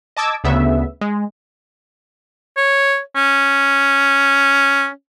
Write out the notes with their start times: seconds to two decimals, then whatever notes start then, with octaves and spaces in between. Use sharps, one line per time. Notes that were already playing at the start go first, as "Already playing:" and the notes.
0.16 D#5 A5 D6 E6 G#6
0.44 D2 C#3 B3 E5
1.01 G#3
2.57 C#5
3.16 C#4